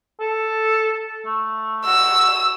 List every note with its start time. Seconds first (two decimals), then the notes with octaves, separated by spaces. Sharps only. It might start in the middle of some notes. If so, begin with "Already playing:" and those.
0.20 A4
1.26 A3
1.86 F#4 E6